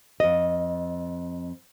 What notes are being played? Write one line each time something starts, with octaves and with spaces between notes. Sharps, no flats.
F2 D#5